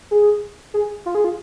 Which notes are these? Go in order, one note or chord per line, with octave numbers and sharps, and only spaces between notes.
G#4
G#4
F4
G#4
F4